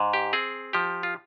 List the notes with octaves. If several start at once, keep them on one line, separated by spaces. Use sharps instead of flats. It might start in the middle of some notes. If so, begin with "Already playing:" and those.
Already playing: G#2
G4
C4 G#4
F3 G4
F4